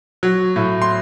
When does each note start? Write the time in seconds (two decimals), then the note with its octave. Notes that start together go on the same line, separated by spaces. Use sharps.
0.23 F#3
0.56 A2
0.82 C6